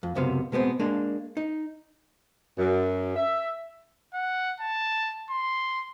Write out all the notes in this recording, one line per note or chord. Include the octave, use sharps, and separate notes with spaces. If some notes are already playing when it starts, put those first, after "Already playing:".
F2
C#2 F#2 C3 B3 F5
B2 G#3 B3 C4
G#3 A#3 D4
D#4
F#2
E5
F#5
A5
C6